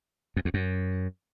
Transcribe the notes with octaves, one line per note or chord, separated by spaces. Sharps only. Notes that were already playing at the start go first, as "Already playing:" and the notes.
F2
E2
F#2